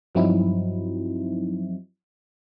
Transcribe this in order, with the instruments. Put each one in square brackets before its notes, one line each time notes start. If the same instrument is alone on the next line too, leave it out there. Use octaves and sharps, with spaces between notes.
[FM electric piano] G2 F3 F#3 C4 D#4 E4